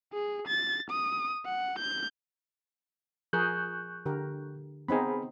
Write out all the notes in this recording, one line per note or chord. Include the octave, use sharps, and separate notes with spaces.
G#4
A6
D#6
F#5
G6
F3 G#4 A#4 C#6 F#6 G6
D3 G4 A#4
B3 C4 D#4 G#4 B5